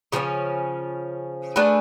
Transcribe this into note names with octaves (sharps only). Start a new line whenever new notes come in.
C#3 F3 A3 C#4
A3 D4 G#4 B4